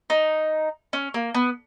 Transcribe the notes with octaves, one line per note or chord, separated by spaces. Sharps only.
D#4
C#4
A#3
B3